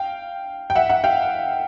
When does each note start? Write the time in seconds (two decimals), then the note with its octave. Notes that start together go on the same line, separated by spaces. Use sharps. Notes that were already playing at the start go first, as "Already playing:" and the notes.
Already playing: F5 G5
0.70 G5
0.75 E5 F#5
0.89 E5 F#5
1.04 F5 G5